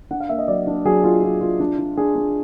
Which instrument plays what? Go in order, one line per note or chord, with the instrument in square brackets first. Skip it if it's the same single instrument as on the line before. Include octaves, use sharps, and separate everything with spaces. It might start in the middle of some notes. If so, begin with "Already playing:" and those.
[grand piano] D4 F#5
F5
A#3 E5
D#5
F#3 D5
D4
F#3 G#4
F4
F4
F4
D4
D4
D4 G#4
D4